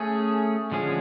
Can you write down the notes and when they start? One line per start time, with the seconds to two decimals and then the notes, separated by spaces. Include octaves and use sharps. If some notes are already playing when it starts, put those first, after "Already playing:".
Already playing: A3 C#4 G#4
0.72 D3 F3 G#3 C#4 G#4